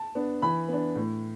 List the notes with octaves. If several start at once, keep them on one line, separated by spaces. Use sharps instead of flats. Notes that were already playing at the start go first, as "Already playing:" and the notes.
Already playing: A5
B3 D4
E3 B5
B3 D4
A2